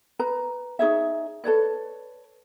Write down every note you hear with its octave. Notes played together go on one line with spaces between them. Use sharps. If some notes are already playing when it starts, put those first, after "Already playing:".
B4 A#5
D#4 G#4 C#5 E5
A4 B4 C#5 D5